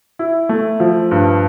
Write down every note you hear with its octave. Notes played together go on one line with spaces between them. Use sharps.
E4
A3
F3
G2